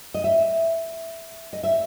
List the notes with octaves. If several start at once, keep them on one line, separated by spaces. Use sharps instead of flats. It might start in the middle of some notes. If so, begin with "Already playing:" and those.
D#5
E5
D#5
E5